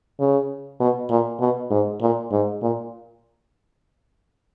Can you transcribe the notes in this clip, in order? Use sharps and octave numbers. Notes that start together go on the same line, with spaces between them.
C#3
B2
A#2
B2
G#2
A#2
G#2
A#2